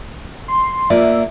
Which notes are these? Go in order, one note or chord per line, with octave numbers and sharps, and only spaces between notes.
C6
A#3 F4 D5 E5